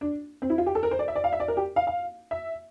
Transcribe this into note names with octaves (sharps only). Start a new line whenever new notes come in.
D4
C4
E4
F4
G4
A4
A#4
C5
D5
E5
D5
F5
E5
D5
A#4
G4
F5
F5
E5